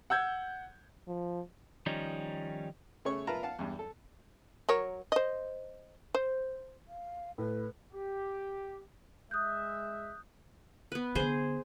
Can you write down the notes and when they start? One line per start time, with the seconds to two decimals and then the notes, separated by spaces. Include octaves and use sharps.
0.10 F#5 E6 G6 G#6
1.08 F3
1.86 D#3 F3 G3 C#4 D#4
3.05 C#3 A3 C#5 C#6
3.27 F4 A#4 B4 E5 A5 A#5
3.43 F5 F#5 A5
3.59 E2 G2
3.79 A4
4.69 F#3 A#4 C#5
5.12 C5 D#5
6.15 C5
6.88 F5
7.38 A2 B4
7.94 G4
9.31 G#3 E5 D#6 F#6 G6
10.92 B3 B4
11.15 D3 B3 G#4 C5